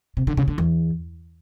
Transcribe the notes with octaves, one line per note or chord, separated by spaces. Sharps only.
C3
D3
C#3
D3
E2